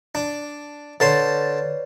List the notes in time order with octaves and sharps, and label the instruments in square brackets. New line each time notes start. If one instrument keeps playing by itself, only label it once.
[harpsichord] D4
[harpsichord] D3 A5 C6 [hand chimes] B4 C#5 D5